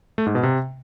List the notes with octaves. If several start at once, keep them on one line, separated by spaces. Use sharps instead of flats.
A3
G#2
B2
C3